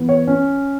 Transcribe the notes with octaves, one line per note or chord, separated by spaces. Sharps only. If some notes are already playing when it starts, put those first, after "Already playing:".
Already playing: E3 B3
C#5
C#4